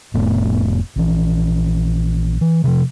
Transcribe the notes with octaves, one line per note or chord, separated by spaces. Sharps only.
F1 A2 A3 B3
A#1 E3
E3
C3 D#3 F3